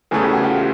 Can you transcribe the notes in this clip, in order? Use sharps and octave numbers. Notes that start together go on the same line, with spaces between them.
E2 C#3 E3 A3 G#4
G4
F#4
F4 G4